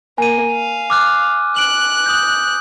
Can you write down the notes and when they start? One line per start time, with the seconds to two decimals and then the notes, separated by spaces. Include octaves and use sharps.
0.18 A#3 G#5 D#7
0.51 F5
0.90 D6 F6 F#6
1.56 F#6 D7 F#7
2.06 D#6 G6